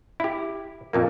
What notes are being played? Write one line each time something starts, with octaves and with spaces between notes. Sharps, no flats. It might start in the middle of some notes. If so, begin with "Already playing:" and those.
E4 G4
F2 A#2 A#3